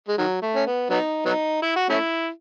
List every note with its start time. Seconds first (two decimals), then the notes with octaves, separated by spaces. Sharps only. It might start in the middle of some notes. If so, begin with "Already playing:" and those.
0.08 G#3
0.18 D#3 F#3
0.42 A3
0.55 C#4
0.67 B3
0.90 F#3 B3 D#4
1.26 F#3 B3 D#4
1.62 E4
1.76 F#4
1.89 A3 C#4 E4